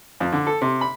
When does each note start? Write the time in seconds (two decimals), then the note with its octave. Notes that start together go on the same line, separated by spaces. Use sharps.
0.20 F2
0.33 D3
0.47 A4
0.62 C3
0.81 B5